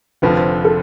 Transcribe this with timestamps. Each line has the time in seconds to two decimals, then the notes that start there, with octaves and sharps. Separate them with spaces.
0.22 F1 F2 D3 F3 B4
0.37 C5
0.65 A4